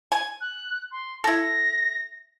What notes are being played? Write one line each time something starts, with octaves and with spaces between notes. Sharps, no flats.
G#5
F#6
C6
E4 A4 A#6